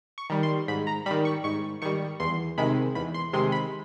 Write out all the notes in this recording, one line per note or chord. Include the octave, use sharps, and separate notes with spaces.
C#6
D#3 G3
C6
G#2 B5
A#5
D#3 G3 B5
C#6
G#2 C#6
D#3 G3 C#6
E2 C6
C3 D#3 G#3 B5
E2 B5
C6
C3 D#3 G#3 C6
B5